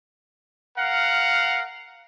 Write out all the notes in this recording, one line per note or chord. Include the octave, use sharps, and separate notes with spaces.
A#4 F5 F#5